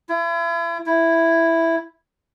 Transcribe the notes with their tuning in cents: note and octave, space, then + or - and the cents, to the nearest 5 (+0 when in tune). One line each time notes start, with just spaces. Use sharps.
E4 +40
E4 +0